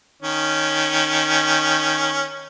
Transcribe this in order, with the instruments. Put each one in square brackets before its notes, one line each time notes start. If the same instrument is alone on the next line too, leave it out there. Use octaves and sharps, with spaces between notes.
[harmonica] D#3 C#4